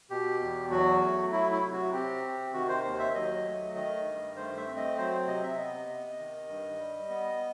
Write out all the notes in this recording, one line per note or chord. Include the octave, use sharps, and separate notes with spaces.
B2 G4
E2
F#3 F#4
A3
F#3 E4
E4
C3
F#4
C4 G4
C3
D#3 F#4
C5
D#2 C5
E5
F#3 D#5
A3
D#3 D#5
G2
A3 C5
E5
C4
D#5
F#3 C5
C3 D#5
E5
B3 D#5
C3
D#3
G2
G3
B3